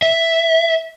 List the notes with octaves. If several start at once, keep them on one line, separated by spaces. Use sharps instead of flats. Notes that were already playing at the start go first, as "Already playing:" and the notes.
E5